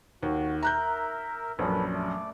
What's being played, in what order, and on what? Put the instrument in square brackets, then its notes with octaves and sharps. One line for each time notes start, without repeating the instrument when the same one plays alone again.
[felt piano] D#2 [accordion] F#4
[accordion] A#4 E5 [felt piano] A#5 F#6 G6
[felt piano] A#1 F#2 [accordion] C#4 A4 B4
[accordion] A3 D5